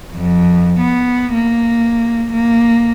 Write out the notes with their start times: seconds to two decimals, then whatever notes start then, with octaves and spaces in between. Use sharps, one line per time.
0.15 F2
0.80 B3
1.34 A#3
2.32 A#3